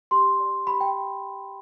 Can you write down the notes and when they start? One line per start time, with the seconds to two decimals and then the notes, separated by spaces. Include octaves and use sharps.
0.11 G4 C6
0.40 D5
0.67 G4 B5
0.81 G5